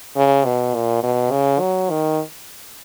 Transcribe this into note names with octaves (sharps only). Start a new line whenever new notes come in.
C#3
B2
A#2
B2
C#3
F#3
D#3